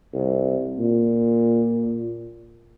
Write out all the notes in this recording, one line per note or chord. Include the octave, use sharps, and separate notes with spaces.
C2
A#2